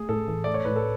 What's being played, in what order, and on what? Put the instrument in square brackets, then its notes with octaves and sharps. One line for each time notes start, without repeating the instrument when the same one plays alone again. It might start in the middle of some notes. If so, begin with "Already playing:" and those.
Already playing: [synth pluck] A3 [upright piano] G#4
[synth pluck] A2 [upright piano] A4
[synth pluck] E3
[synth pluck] A3 [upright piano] D5
[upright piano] C#5
[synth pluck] A2 [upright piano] B4
[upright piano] A4